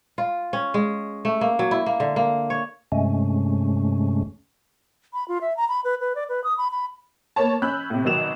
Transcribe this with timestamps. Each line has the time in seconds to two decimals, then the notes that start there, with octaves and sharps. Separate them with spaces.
0.18 F4
0.53 C#4
0.74 G#3
1.25 A3
1.41 A#3
1.59 F#3
1.71 E4
1.86 A#3
2.00 D3
2.16 A#3
2.50 C#5
2.92 G2 C3 G#3 A3 C#4
5.13 B5
5.28 F4
5.41 E5
5.57 A#5
5.69 B5
5.84 B4
6.00 B4
6.15 D5
6.29 B4
6.44 D#6
6.58 B5
6.71 B5
7.36 A#3 B3 C#5 A5
7.62 C#4 B5 E6 F#6 G6
7.90 A2 C3
8.04 G#1 B2 D#3 F#3 E7 F7